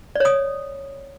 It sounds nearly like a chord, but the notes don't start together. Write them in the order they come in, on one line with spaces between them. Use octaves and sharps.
D5 C#5 D#6